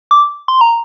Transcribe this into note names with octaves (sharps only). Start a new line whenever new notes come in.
D6
C6
A#5